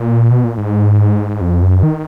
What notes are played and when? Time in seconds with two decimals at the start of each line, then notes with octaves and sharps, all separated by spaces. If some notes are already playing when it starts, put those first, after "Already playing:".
Already playing: A#2
0.31 B2
0.44 A#2
0.57 G#2
1.41 F2
1.63 F#2
1.83 D#3